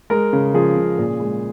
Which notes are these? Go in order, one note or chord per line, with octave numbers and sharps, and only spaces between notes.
G#3 A#4
C#3
F3 G#4
C#3
A#2
G#3